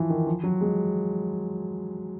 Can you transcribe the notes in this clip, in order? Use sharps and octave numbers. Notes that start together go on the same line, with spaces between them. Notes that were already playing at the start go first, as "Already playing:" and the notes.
Already playing: E3 F3
D#3
F3
F#3
G#3